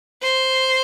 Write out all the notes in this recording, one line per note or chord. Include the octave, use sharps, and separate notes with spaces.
C5